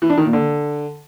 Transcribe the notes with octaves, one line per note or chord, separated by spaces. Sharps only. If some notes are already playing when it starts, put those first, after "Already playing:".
E3
D4
D#3
A#2
D3